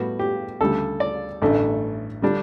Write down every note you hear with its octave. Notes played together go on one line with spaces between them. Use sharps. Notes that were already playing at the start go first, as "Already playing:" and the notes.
Already playing: A2 G3 B3 F#4
G4
D2 C#3 G3 A4
D5
A1 G2 D3 A3
D3 G3 D4